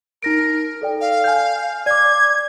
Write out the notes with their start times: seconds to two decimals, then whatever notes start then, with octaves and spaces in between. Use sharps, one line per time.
0.23 D#4 A#4 A#6 D7
0.82 A4 D5 G5
1.01 F5
1.24 G#5 F6 G6
1.86 D5 D6 G#6